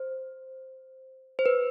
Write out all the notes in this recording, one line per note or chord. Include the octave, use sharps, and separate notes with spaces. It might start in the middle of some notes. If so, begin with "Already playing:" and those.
Already playing: C5
C5
B4